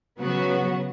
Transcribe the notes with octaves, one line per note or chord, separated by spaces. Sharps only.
C#3 F#3 B3 F#4